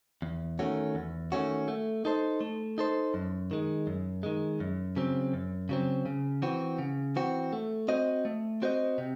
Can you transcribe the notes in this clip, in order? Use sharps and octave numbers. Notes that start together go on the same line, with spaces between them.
E2
D#3 A3 C#4 F#4
E2
D#3 A3 C#4 F#4
A3
D#4 A4 C5
A3
D#4 A4 C5
F#2
D#3 G#3
F#2
D#3 G#3
F#2
C#3 F#3 C4
F#2
C#3 F#3 C4
C#3
E3 C4 F#4
C#3
E3 C4 F#4
A3
C4 F#4 C5 D#5
A3
C4 F#4 C5 D#5
C3